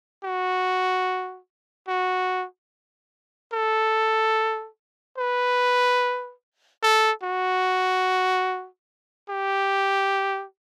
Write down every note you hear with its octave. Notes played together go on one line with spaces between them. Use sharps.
F#4
F#4
A4
B4
A4
F#4
G4